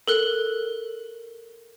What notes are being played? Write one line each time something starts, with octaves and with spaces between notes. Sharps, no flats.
A4 A#4 F#6